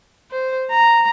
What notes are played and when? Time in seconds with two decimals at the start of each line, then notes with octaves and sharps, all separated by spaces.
0.31 C5
0.71 A#5